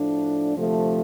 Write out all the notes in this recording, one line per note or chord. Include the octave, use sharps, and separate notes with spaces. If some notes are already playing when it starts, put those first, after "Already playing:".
Already playing: A2 F3 A3 D4
D2 C3 F3 A3